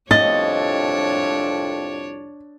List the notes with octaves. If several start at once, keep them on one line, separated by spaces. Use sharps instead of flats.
C2 F2 D4 C#5 D#5 A6